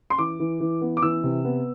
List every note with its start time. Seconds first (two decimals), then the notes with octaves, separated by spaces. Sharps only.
0.10 C6
0.18 E3 D6
0.40 E3
0.60 E3
0.81 B3
0.97 D6
1.02 E3 E6
1.24 C3
1.45 B3